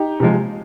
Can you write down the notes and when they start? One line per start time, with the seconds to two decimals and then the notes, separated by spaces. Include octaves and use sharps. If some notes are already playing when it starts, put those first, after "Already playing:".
Already playing: D#4 G4
0.20 C3 F3 G#3